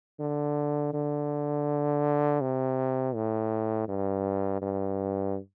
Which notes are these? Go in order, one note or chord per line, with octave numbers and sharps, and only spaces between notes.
D3
D3
C3
A2
G2
G2